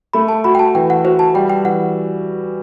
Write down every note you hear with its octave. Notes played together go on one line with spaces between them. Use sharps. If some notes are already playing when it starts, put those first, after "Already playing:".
A3 B5
A5
F#4 B5
G5
A5
E3 G5
F#5
F#4 C5
A5
G3 G5
G5
E3 F#5